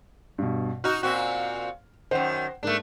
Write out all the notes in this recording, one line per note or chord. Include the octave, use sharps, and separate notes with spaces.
G2 B2
D#4 F#4 F6
A#2 C4 F#4
F#2 D#3 C5 F#5 G5
G#2 A3 A#3 D4